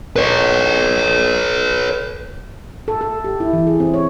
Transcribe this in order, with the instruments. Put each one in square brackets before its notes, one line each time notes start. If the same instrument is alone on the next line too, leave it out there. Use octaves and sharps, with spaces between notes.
[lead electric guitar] B4 C#5
[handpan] A4
A4
G4
E4
E3
G#4
C4
C#5